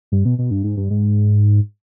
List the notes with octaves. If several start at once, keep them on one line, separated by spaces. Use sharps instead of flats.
G2
B2
B2
G2
G#2
G2
G#2